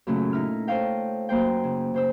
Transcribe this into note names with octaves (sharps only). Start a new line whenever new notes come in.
F#2 A#2 C#3 A3 C#4
D#4 E4 F6
A4 C5 C#5 D#5 F5 G5
F#2 A#3 C5 G5
C#3
C#3 C5 E6